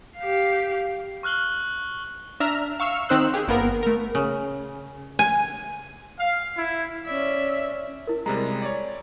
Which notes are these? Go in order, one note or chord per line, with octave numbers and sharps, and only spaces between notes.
G4 F5
C#6 F6 F#6 F#7 G7
D4 E5 A#5 F6
F5 C#6 E6 F6
D#3 C4 D#4 C5 E6 F#6
G4 G#4
G1 A#3 B3 A#4
A3 A#4
C#3
G#5
F5
E4
C#4 D5 E5
E4 A#4
C3 G3 G#3 A#5
C#5 D5